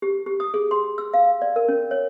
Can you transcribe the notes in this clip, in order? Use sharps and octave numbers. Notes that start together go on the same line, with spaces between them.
G4
G4
D#6
G#4
C6
E6
F5
D5
A#4
C#4
C#5